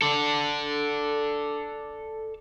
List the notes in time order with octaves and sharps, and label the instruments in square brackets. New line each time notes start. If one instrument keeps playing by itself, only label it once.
[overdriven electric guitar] A4 D5